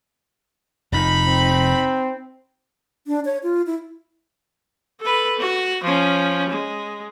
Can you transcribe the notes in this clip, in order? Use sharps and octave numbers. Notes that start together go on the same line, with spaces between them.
F1 F2 D#4 B5
C4
D4
C#5
F4
E4
A4 B4
F#4
F3 C#4
G#3